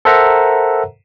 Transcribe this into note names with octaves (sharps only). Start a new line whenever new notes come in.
A4 A#4 C5 E5 F#5 A#5